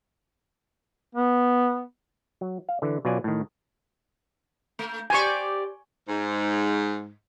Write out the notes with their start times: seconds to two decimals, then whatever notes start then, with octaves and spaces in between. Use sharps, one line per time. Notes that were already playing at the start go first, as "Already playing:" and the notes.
1.15 B3
2.41 F#3
2.69 F5
2.82 D3 E3
3.05 B2 F#3 C#4 F4 D5 G#5
3.24 A2 D#3
4.79 A3
5.10 G4 C5 D5 G#5 C#6
6.08 G#2